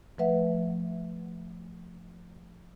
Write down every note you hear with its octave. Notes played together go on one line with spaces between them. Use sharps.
F3 A3 B4 E5 F#5